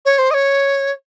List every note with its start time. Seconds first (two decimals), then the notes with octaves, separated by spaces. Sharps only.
0.05 C#5
0.18 C5
0.30 D#5
0.33 C#5